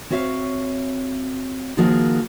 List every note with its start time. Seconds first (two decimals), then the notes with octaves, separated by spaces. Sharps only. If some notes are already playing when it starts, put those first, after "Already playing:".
0.10 C4 F#4 C#5 E5 F5
1.77 D#3 F3 A#3 F#4 G#4 A#4